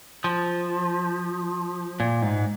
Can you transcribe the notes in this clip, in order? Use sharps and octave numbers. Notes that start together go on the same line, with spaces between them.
F3
A#2
G#2